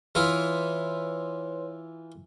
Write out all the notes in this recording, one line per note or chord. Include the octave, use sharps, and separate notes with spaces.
E3 E4 F4 B4 C#5 C6